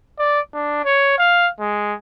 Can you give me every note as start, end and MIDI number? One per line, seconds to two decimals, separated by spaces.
0.19 0.40 74
0.54 0.82 62
0.85 1.14 73
1.18 1.49 77
1.60 1.94 56